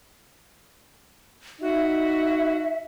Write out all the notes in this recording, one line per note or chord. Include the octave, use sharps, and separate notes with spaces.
D#4 F#4 E5